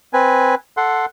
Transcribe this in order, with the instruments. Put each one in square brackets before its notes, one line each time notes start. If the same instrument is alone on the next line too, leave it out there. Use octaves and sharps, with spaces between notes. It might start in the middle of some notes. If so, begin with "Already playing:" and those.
[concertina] C4 B4 G#5
A4 F#5 C6